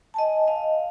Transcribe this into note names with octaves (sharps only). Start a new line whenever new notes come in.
D#5 G#5 A5
D#5 F5